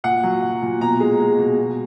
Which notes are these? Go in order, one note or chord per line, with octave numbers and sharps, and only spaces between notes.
A#2 F#5
F#3
F#3
A#2
B2 A#5
G#3
G#3
B2
B2